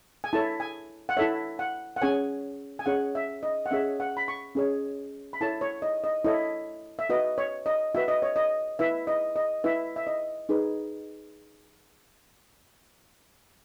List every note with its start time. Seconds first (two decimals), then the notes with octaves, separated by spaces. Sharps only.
0.24 G#5
0.33 E4 A4 C#5 A5
0.60 G#5
1.09 F#5
1.17 E4 A4 C#5 E5
1.59 F#5
1.96 F#5
2.01 C#4 G#4 C#5 G#5
2.79 G#5
2.86 C#4 G#4 C#5 F#5
3.15 E5
3.43 D#5
3.66 F#5
3.71 C#4 G#4 C#5 E5
4.00 F#5
4.17 B5
4.28 C#6
4.55 C#4 G#4 C#5
5.33 B5
5.41 E4 A4 C#5 A5
5.61 C#5
5.82 D#5
6.04 D#5
6.24 E4 A4 C#5 D#5
6.99 E5
7.10 F#4 B4 D#5
7.38 C#5
7.66 D#5
7.95 F#4 B4 E5
8.08 D#5
8.22 C#5
8.36 D#5
8.79 E4 B4 E5
9.07 D#5
9.36 D#5
9.64 E4 B4 E5
9.96 E5
10.07 D#5
10.49 D#4 G#4 B4